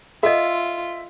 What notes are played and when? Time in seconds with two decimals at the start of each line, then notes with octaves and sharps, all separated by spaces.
0.23 F4 A4 D#5 E5